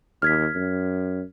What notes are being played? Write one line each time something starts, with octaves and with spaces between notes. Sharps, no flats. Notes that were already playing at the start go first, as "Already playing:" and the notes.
D#2 F6 G#6 B6
F#2